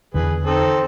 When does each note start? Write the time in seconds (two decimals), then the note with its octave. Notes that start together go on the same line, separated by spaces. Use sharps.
0.14 E2 D3 G#4 B4
0.46 C4 D#4 A4